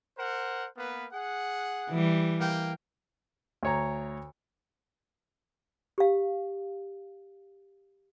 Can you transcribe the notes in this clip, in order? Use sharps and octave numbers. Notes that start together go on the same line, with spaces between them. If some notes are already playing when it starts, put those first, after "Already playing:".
A#4 C5 F#5
A#3 B3 B4
G#4 F#5
E3 G3
A#3 G5
D2 C#5 A#5
G4 F5